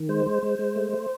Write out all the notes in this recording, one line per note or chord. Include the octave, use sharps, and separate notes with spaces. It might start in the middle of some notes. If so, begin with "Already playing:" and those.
Already playing: D#3
G#3 C5
G#3
G#3
G#3
A3
A3